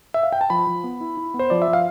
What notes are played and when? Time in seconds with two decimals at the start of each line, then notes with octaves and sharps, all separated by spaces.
0.14 E5
0.23 F5
0.32 G5
0.41 A5
0.50 F3 B5
0.67 F3
0.84 B3
1.01 E4
1.17 E4
1.34 B3
1.39 C5
1.50 F3 D5
1.62 E5
1.68 F3
1.73 F5